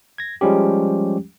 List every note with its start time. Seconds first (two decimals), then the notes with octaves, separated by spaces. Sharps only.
0.18 G#6 A#6
0.41 F3 G3 G#3 C#4 G4